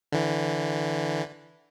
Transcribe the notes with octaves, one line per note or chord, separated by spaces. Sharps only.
D3 E3